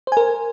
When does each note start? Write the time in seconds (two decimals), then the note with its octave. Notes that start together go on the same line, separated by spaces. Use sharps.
0.07 C5
0.12 G#5
0.17 A#4